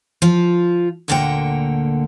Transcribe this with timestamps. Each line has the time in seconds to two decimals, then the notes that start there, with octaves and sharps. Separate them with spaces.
0.22 F3 F4
1.08 D2 A#2 D3 A#3 F#5 G5